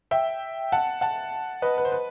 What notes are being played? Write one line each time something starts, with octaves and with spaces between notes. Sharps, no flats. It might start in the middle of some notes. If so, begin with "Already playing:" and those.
E5 G5
F#5 A5
F#5 A5
B4 D#5
B4
C5
B4